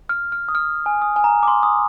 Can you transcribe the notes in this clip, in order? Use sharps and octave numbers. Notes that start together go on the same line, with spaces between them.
F6
F6
D#6
F6
G#5
D#6
G#5
A#5
D6
C6
D#6